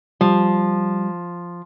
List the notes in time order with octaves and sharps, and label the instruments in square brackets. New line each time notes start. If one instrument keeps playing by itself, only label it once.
[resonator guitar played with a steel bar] F3 [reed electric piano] G3